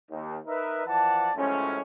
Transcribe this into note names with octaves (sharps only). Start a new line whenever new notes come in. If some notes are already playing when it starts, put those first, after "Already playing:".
D#2
D#4 A#4 B4 E5
E3 F3 D5 F#5 A5
F#2 A2 F3 G#3 C#4